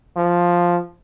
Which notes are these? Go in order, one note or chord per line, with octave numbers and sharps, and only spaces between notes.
F3